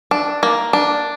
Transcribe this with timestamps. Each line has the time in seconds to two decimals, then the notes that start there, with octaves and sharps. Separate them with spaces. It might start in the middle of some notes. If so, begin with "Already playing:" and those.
0.11 D4
0.43 A#3
0.73 D4